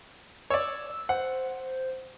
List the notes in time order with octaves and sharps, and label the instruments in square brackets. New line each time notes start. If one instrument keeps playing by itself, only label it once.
[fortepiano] C#5 D5 [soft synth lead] E6
[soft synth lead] C5 [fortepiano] F#5